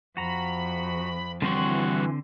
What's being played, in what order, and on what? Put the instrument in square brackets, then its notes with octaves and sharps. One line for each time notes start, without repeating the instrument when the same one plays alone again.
[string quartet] F2 [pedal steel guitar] F#4 A#5 [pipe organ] B5
[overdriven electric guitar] G2 F#4 [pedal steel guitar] D3 C4 C6 [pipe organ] E3